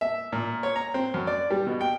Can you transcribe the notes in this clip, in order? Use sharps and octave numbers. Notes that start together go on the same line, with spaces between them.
E5
A#2
C#5
A#5
C4
F#2
D5
G3
B2
G5